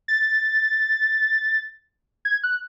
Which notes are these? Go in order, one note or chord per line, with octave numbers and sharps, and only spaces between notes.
A6
G#6
F#6